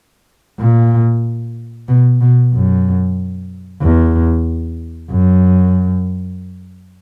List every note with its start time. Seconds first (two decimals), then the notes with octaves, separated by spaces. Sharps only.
0.59 A#2
1.88 B2
2.21 B2
2.54 F#2
3.82 E2
5.11 F#2